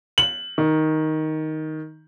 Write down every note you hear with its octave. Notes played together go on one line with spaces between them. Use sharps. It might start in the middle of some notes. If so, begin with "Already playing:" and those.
F#7
D#3